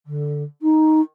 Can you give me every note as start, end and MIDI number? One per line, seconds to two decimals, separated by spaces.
0.06 0.43 50
0.62 1.00 63